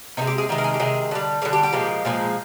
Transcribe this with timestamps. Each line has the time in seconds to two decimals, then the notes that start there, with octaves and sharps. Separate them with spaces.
0.17 C3 D#3 D#4
0.22 G#3
0.27 G4
0.38 G#4
0.49 C3 D#3 G#3
0.58 A#4
0.64 G#4
0.74 G4
0.80 C3 D#3 G#3 G#4
1.11 D3 G3
1.42 D3 G3 G#4
1.53 G4
1.63 G4
1.73 A#2 F3 G#3
2.05 A#2 F3 G#3